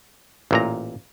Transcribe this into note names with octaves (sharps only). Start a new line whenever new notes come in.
A1 A#2 A#5